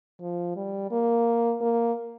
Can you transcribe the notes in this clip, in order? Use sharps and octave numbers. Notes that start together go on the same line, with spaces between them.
F3
G3
A#3
A#3